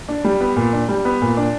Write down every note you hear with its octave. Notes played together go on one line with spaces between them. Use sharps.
D4
G3
B3
A#2
D4
G3
B3
A#2
D4